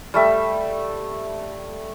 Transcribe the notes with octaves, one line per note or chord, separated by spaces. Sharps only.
G3 A3 E5